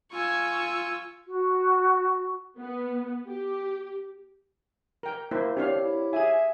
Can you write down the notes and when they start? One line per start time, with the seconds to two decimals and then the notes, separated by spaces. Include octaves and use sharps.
0.12 F4 G#5 C#6 E6
1.27 F#4
2.58 B3
3.28 G4
5.03 A#4 G5
5.31 A#3 E4 C5
5.57 C4 D4 G4 C#5 F5
5.82 E4
6.13 G#4 E5 G#5